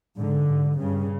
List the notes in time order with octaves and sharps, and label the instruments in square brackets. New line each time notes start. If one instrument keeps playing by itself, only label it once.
[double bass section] G#2 D3
G#2
G2 C#3